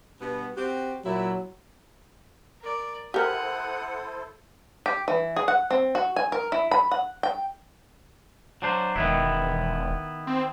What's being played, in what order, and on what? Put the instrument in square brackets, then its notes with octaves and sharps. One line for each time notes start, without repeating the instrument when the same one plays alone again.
[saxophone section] G2 B2 B3
C4 F#4 G4
[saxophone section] A#2 E4 [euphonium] F#3
[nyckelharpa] A#4 D5
[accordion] E4 A4 C5 [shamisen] G4 A#4 [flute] F#5 [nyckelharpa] D#6
[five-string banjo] G4
E3
G#4
F#5
C4
F#4
G#5
A#4
E4
B5
F#5
G5
[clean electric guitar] F#3 D4 C5
[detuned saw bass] E1 [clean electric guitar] D#3 B3 E4
[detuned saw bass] C4